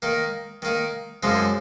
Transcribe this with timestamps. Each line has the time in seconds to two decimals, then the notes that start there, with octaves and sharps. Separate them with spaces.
0.02 D#3 A#3 D#4
0.62 D#3 A#3 D#4
1.23 F#2 C#3 F3 G#3 D#4